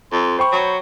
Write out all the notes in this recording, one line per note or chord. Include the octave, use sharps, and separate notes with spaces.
F2 C6
C5 G5 B5 C#6
F#3